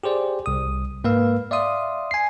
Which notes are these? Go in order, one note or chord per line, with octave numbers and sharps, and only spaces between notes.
G4 G#4 C5 D5
C2 D#6
G#2 A#3 B4 F5 E6
D5 E5 F5 C6 D#6
G#5 C7